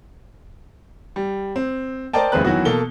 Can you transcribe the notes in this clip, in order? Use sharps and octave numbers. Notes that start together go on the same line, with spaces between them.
G3
C4
A#4 C5 D5 D#5 G5 A5
F1 D#2 G#3 C4 B4 F#6
D#3 E3 F#3 B3 F#4
B2 A#3 A4 G7